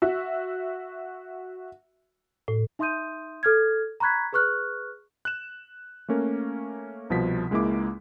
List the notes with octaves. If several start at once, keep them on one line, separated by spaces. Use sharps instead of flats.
F#4 E5
A2
D#4 E5 C6 D#6 G6 D#7
A4 F6 G#6
A#5 B5 C#6 F#6 G#6 B6
G#4 B4 C#6 F6 F#6
F#6 E7
A3 A#3 C#4 A#4
C2 B2 F3 B6
C#2 G#3 A#3 E4 D6